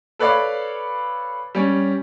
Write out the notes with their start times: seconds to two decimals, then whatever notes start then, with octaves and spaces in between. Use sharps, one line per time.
0.19 A4 B4 C#5 D5 F5 B5
1.55 G3 C#4